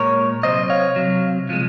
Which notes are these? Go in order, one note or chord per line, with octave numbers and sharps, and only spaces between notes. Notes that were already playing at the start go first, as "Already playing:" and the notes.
Already playing: A#2 G#3 A#4 C#5
C3 F#3 C5 D#5
C#5 F5
C3 F#3
C3 F3 G#3